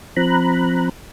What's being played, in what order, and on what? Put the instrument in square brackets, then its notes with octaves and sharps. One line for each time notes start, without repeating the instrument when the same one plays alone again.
[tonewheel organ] F3 C4 A#5 B5 F#6